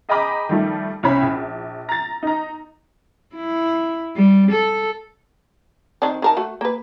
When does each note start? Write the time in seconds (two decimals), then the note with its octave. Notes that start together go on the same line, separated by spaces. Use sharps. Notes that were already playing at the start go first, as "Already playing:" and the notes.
0.09 G#4 D#5 G5 A#5 B5 D6
0.49 D#3 F3 G3 A3
1.03 C2 C#4 C#5 B5
1.22 A#1
1.89 A#5 A6
2.23 D#4 A#5
3.36 E4
4.17 G3
4.52 A4
6.02 D#3 C4 D4
6.22 D#3 A#4 A5
6.37 A3 F#4
6.61 A#3 B4